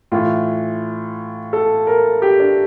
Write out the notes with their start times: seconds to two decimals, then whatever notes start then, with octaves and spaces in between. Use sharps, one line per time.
0.12 A2 E3 F4
1.53 A4
1.87 A#4
2.22 G4
2.40 D4